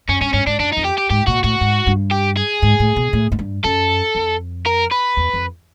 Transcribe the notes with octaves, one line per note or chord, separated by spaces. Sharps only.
F#2 C#4
G2 C#4
G2 C#4
G#2 D4
F#2 D4
D#4
F2
G4
G4
G#2 G4
A#2 F#4
A2 F#4
G#2
G2
G4
G#4
G#2
A2
B2
A2
G#2
G2
F#2 A4
F2
A#4
B4
E2
F2